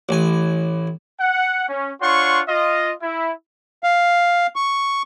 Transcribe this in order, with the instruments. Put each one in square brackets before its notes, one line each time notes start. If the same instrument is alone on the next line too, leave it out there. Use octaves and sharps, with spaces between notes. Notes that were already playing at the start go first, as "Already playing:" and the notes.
[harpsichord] A1 G#5
[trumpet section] F#5
C#4
D4 F4 C#5 F#5 C6 C#6
F4 D#5
E4
[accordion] F5
C#6